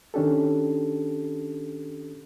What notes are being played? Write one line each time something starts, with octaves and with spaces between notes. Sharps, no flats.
D#3 C#4 D4 G4 A4